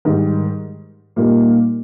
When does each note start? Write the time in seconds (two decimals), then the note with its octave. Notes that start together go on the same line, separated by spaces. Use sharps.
0.05 G#2 D#3 G3
1.16 A#2 G3 A#3 D#4